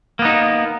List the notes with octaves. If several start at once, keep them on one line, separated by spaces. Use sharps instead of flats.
A#3 B3 D#4